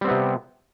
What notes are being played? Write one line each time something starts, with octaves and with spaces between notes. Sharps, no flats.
C3 G3 B3 C4